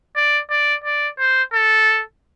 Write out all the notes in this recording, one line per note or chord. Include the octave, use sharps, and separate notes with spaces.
D5
D5
D5
C5
A4